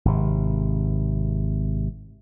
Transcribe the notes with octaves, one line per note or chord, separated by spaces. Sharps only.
G#1 C3